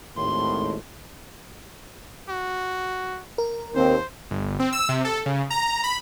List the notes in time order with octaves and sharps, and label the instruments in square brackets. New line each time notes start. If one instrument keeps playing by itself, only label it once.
[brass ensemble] G#1 D#2 A2 [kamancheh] C6
[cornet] F#4
[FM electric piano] A#4
[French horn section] D#2 C4 [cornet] C5
[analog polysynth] G1
C4
E6
C3
A4
C#3
A#5
B5